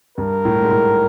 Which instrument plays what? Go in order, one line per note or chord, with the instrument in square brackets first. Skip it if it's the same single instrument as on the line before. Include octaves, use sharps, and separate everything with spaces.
[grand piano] G2 [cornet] A#4
[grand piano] A2
G#2
A2